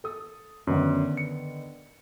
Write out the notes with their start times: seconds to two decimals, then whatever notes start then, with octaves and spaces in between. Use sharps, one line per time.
0.04 A4 D#6
0.67 F#2 D3 D#3 B3
1.17 C#7